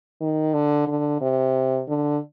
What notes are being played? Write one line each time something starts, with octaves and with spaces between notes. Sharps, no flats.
D#3
D3
D3
C3
D3